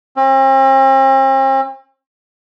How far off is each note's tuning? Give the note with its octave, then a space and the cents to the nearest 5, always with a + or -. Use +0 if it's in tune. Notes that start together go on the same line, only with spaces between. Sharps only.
C4 +45